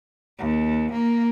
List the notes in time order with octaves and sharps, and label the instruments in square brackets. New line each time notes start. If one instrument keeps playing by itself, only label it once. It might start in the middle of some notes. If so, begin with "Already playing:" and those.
[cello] D#2
A#3